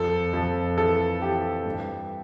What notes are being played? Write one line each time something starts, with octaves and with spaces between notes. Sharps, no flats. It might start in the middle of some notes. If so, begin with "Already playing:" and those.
Already playing: F2 A4
F2
E3 A4
E3 G4
G2